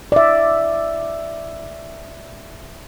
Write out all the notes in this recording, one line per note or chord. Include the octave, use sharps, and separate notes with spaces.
D5 E5